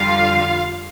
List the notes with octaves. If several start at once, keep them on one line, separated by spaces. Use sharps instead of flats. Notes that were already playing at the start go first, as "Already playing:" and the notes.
Already playing: F2 D3 G3 F4 F5